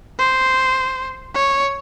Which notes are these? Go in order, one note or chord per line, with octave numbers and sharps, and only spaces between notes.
C5
C#5